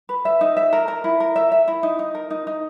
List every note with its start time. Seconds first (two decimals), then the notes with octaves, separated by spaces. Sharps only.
0.09 B4
0.25 E5
0.41 D#4
0.57 E5
0.73 A#4
0.88 A#4
1.04 E4
1.20 A#4
1.36 E5
1.52 E5
1.68 E4
1.83 D#4
1.99 D#4
2.15 A#4
2.30 D#4
2.47 D#4